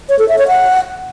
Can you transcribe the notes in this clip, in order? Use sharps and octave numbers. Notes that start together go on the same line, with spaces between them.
C#5
A4
E5
C#5
F#5